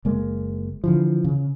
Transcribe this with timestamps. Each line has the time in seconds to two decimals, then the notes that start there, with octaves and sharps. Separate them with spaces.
0.05 F#1 G#3 A#3
0.84 D3 E3 F3
1.24 C#3